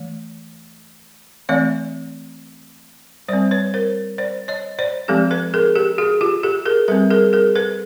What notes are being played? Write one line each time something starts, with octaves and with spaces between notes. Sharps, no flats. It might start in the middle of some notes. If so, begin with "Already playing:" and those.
Already playing: E3 A3
E3 A3 C4 D5 E5
G3 C4 C5 D5
B4 C#5
A#4 C5
C5 D5
C#5 D#5
C5 D5
F3 G#3 C4 G4 A4
A4 B4
G#4 A#4
G4 A4
F#4 G#4
F4 G4
G4 A4
G#4 A#4
G3 C4 A4 B4
G#4 A#4
G#4 A#4
A4 B4